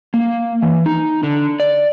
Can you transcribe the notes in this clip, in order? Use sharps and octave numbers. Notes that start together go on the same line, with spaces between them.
A#3
E3
D#4
D3
D5